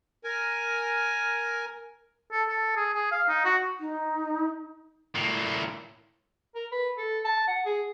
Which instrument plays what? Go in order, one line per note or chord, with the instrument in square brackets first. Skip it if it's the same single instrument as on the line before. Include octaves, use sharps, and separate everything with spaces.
[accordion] A#4 G#5
[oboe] A4
A4
G#4
G#4
F5
D#4
F#4
[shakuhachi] D#4
[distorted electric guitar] A2 A#3
[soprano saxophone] A#4
B4
A4
A5
F#5
G#4